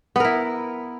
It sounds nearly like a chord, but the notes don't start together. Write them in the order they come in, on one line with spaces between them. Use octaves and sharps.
B3 A#4 E4